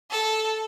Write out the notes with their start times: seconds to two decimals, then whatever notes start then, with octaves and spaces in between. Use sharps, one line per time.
0.11 A4